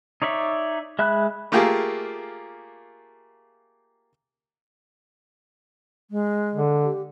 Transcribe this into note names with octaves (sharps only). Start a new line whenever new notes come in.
D#4 C#5 D5 E5
G#3 E5 B5 F#6
A3 A#3 F4 G4 G#4 A#4
G#3
D3
G4